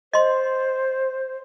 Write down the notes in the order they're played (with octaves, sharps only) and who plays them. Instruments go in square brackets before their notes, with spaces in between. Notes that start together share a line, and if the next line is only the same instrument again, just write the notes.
[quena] C5 [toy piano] D#5 C6